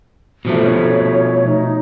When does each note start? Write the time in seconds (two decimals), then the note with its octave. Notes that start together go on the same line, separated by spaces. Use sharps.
0.45 B2 F3 A3
0.63 C#5
1.46 D#4